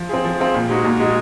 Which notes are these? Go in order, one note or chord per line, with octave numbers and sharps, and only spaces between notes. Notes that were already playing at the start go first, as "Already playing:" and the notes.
Already playing: F3
C4 F4 G#4
F3
C4 F4 G#4
A#2
G#3 D#4 F#4
A#2
G#3 D#4 F#4